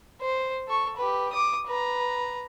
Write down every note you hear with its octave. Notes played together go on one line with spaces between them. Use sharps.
C5
A4 C#6
G4 B4
D6 D#6
B4 A#5